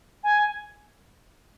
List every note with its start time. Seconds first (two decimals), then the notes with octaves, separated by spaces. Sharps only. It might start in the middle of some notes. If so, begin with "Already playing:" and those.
0.23 G#5